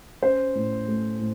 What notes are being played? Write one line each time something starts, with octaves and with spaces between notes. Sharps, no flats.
C#4 C5
A2
A3
A2